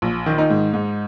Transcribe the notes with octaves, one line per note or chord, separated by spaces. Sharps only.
A#1
D#3
D#4
G#2
G#2